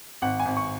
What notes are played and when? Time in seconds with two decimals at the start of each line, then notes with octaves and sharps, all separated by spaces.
0.22 G#1 F#5
0.40 G#5
0.46 G#1
0.57 C#6